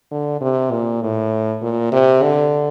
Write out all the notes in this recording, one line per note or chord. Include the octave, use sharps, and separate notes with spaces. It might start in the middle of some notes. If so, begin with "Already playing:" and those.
D3
C3
A#2
A2
A#2
C3
D3